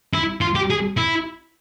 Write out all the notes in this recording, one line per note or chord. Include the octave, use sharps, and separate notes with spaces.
E4
F4
G4
G#4
E4